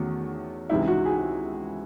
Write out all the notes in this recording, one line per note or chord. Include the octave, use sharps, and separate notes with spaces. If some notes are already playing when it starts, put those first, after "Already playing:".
Already playing: E2 D#3 A3 C#4 F#4
C#2 C3 E3 G#3 D#4 E4
F#4
G#4